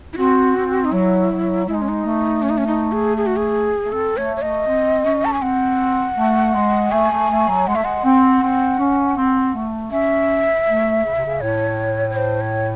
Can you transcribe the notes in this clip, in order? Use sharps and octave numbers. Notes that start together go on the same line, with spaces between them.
E4
C4 F#4
C4
D#4
F#3 E4
F#3
G#3 E4
D#4
C#4
D#4
A3
C#4
D#4
C#4
D#4
G#4
G#4
F#4
G#4
A3
C4 A4
A3 C#5
C#5
A3 D#5
C4
C#4
A5
G#5
C4 F#5
A3
G#3
A3 G#5
A3
A3
F#3
G#3 F#5
A3 E5
G#3 F#5
C4
C4
C#4
C4
A3
C#4 E5
A3
C#3
C3
C#3
A2 C#5
C#5
C5
C#5